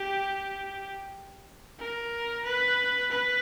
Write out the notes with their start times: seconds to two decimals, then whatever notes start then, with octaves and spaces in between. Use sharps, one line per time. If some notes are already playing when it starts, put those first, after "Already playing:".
Already playing: G4
1.79 A#4
2.45 B4
3.11 B4